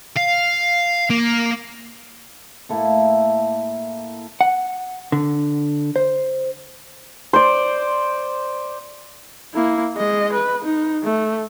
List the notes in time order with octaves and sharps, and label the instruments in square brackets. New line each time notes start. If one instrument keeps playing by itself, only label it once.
[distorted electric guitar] F5
A#3
[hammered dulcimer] A2 A#3 E4 A4
[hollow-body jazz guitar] F#5
D3
C5
[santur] C5 D5
[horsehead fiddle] A#3 E4
G#3 D#5
B4
D#4
A3